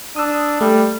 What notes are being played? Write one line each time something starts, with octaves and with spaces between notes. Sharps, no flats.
D4 D#6 E6
G3 A3